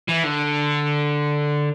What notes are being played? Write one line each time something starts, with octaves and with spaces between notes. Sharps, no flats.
E3
D3